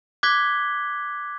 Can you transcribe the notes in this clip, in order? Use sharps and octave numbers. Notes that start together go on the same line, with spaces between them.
D6 F#6 G#6 B6 G7